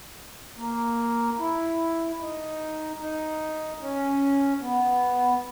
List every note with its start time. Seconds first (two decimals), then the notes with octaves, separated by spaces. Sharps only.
0.57 A#3
1.39 E4
2.19 D#4
3.00 D#4
3.81 C#4
4.61 B3